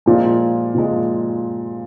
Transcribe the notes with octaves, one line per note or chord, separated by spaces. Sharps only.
A#2 F3 G#3
A#2 F3 G#3